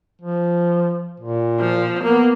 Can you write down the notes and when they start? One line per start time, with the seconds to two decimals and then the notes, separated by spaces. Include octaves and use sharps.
0.22 F3
1.20 A#2
1.60 F3
2.04 A#3 B3